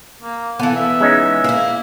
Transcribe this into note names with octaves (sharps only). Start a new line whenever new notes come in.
A#3
E3 B3 A4 F5
E5
G#3 C#4 D#4
A#3 E4